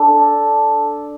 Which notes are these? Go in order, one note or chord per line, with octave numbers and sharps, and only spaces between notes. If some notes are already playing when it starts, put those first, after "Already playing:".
Already playing: D4 A4